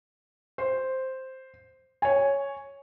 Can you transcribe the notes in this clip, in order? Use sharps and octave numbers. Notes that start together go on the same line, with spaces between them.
C5
C#5 G#5